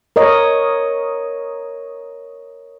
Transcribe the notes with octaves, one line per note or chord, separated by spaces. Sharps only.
A#4 C#5 D#5